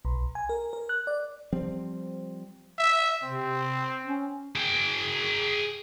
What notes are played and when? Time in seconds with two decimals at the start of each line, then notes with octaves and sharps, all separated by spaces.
0.05 B1
0.35 G#5
0.49 A#4
0.73 A#4
0.89 F#6
1.07 D5
1.53 F3 G3 C4
2.78 E5
3.24 C3 C4
4.05 C#4
4.56 G#4 G5